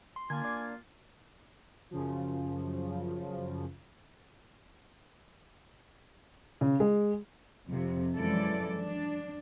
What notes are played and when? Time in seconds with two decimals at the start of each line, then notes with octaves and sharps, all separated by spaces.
0.16 C6
0.30 D3 A#3 F4 G#5 G#6
0.42 D4 D5
1.91 F#2 C#3 F3
6.61 C#3
6.80 G#3
7.67 F2 C3
8.16 F#2 E3 F3 G#3 A4 D5
8.80 D4